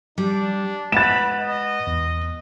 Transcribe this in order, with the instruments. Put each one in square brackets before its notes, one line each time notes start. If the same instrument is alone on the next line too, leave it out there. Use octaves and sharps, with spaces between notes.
[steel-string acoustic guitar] G3 [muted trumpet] D4
[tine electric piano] G#3 F#5 F#6 [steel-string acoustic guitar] B4 [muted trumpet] B5 [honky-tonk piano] A6 E7
[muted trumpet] D#5
[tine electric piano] E2